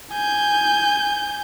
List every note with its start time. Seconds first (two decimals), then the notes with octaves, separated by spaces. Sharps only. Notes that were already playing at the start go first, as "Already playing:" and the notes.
0.12 G#5 G6